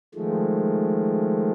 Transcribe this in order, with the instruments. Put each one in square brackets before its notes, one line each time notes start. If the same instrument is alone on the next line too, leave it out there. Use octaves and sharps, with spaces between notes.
[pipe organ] D#3 F3 G#3 A3